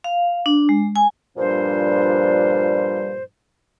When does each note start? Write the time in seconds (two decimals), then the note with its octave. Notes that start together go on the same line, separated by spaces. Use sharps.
0.04 F5
0.46 D4
0.69 G#3
0.96 G#5
1.37 G2 A#2 F3 G3 D4 C5